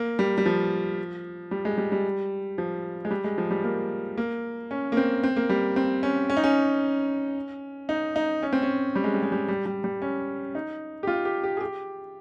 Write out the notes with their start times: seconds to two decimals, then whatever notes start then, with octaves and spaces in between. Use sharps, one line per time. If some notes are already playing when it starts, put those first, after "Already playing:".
Already playing: A#3
0.19 G3
0.38 G3
0.46 F3
1.51 G3
1.65 G#3
1.78 G3
1.92 G3
2.58 F3
3.05 G#3
3.10 G3
3.24 G#3
3.38 F3
3.51 G3
3.64 A#3
4.18 A#3
4.71 C#4
4.92 A#3
4.97 C4
5.23 C4
5.36 A#3
5.49 G3
5.76 C4
6.03 C#4
6.30 C#4
6.37 D#4
6.44 C#4
7.89 D#4
8.16 D#4
8.43 C#4
8.53 C4
8.62 C#4
8.95 G3
9.04 G#3
9.14 G3
9.23 G#3
9.32 G3
9.48 G3
9.66 G3
9.84 G3
10.02 C#4
10.55 D#4
11.03 G4
11.07 F4
11.25 G4
11.44 G4
11.57 G#4
11.61 G4